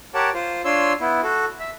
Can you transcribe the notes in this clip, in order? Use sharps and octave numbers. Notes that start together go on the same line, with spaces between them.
G4 A#4 C#5 F#5 A5
F4 C5
D4 F4 C#5 C6 E6
B3 E4
F#4 A4
E5